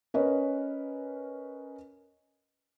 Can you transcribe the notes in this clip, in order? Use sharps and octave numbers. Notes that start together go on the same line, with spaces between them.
C#4 A#4 B4 C#5 D#5